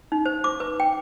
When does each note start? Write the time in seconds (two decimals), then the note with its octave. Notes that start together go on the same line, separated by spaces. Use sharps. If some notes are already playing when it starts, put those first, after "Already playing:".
0.12 D#4
0.26 C5
0.44 D6
0.60 B4
0.80 G5